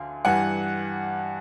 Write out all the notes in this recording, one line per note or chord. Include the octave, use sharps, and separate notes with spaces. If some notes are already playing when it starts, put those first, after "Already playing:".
Already playing: D2 D3 F5 G#5
G2 E3 G3 F#5 G#5